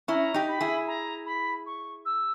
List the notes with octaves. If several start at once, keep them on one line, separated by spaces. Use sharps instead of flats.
C#4 E4 A#5
D#4 G4
B5
E4 G#4
A#5
B5
C#6
E6